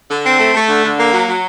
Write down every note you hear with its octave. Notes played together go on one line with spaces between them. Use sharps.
D3
C4
A3
A3
D3
D3
A#3
F#3
F#3